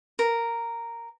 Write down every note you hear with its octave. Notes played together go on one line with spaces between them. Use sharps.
A#4